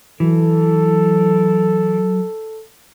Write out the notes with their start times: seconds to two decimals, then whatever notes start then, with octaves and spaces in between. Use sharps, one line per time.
0.20 E3 F#3 A4